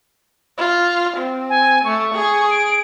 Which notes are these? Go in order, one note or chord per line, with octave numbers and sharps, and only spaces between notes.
F4
C4
G#5
A3 C#6
G#4
D7